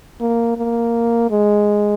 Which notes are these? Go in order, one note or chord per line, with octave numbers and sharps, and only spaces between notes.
A#3
A#3
G#3